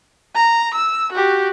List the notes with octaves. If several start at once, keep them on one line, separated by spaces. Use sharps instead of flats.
A#5
E6
F#4 G4